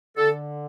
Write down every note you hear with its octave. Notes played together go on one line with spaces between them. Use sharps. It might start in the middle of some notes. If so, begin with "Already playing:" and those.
D3 A4